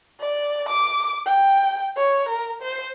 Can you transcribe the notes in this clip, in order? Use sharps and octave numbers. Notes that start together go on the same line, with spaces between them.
D5
D6
G5
C#5
A#4
C5